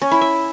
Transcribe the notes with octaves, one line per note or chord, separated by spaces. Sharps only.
C#4
E4
E5